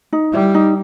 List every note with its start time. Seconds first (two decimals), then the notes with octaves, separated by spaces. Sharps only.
0.13 D#4
0.33 G3 E4
0.54 D#4